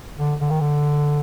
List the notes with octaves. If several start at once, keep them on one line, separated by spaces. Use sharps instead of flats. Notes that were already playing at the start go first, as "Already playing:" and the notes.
D3
D3
D#3
D3